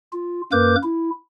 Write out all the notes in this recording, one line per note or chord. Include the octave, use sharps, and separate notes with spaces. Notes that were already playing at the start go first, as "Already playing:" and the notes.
F4
F#2 A#3 A#4 B4 D6 G6
E4